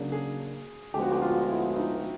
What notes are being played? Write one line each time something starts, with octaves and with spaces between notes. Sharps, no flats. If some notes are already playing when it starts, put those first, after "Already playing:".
Already playing: C#3 F#3 A#3 D4 G#4
G#4
D2 D3 F3 G#3 B3 G4
F#4
G4
F4
E4
D#4